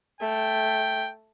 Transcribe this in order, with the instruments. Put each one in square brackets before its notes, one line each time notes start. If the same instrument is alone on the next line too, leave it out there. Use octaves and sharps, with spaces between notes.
[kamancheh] A3 [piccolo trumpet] G5